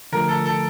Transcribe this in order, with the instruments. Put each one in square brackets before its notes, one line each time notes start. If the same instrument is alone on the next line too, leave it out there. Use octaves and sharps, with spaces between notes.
[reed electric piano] D3 F3 A3 [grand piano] A#4
[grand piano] A4
A4